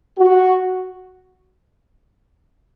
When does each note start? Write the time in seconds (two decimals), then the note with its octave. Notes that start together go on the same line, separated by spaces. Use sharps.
0.19 F#4